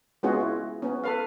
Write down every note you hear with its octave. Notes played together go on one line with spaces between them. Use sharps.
G#3 B3 C#4 F4 F#4 G#4
E4
B3 C#4
A4 B4 F5